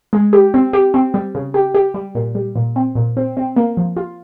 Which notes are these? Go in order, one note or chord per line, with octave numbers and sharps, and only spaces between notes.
G#3
G4
C4
G4
C4
G3
C#3
G4
G4
G3
A#2
G3
A#2
C4
A#2
C4
C4
A#3
F3
F4